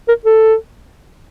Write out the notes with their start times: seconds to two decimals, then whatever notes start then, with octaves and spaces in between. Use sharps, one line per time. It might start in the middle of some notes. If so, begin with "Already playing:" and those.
0.08 A#4
0.25 A4